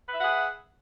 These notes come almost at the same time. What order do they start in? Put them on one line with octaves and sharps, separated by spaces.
B4 E5 F#5 G#4